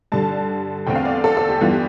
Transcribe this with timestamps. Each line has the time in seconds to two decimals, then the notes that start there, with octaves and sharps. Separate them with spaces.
0.12 G2 D3 G3 A5
0.86 E2 D3 A3 C4 G5
0.96 F5
1.05 D5
1.24 A4
1.37 A4
1.49 G4
1.61 G2 E3 G3 B3 F4
1.71 G4